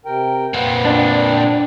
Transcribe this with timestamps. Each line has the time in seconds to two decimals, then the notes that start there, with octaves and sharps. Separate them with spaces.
0.05 C3 A#4 G5
0.54 A#2 C4 B4 F#5
0.85 D4 D5